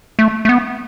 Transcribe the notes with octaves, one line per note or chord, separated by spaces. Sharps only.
A3
A3
B3